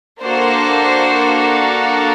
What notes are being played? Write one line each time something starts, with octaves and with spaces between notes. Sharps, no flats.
A#3 D4 F#4 A4 C5